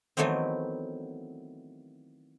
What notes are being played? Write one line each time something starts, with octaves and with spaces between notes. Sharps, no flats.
D#3 E3 F#3 A3 B3 C4